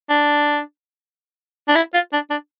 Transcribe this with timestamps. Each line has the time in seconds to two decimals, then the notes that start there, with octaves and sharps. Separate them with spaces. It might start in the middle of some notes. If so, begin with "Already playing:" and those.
0.09 D4
1.68 D4
1.75 E4
1.94 F4
2.13 D4
2.30 D4